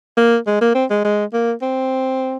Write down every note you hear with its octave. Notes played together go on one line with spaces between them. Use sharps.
A#3
G#3
A#3
C4
G#3
G#3
A#3
C4